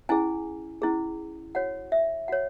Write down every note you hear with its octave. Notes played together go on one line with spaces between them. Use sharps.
C#4 E4 G#4 G#5
C#4 E4 G#4
F#4 C#5 F#5
E5
F#4 C#5 F#5